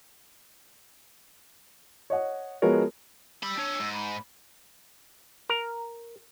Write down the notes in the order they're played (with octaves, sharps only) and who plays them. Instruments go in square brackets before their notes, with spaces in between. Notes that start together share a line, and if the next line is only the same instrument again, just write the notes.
[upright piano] C#5 D#5 F#5
F3 G#3 B3 F#4 A#4 C#5
[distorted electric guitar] G3 B5 [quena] E6
[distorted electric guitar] D4 C#5
G#2
[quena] B5
[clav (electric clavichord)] A#4